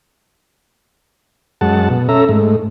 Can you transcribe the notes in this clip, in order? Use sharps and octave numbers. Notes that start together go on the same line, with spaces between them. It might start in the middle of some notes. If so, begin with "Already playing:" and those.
F#2 G#3 F#5 A5
B2
C#4 A4 E5 A#5
G#2 A3